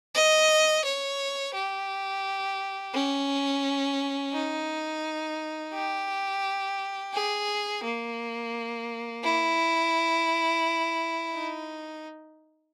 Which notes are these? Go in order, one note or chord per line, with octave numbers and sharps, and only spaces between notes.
D#5
C#5
G4
C#4
D#4
G4
G#4
A#3
E4
D#4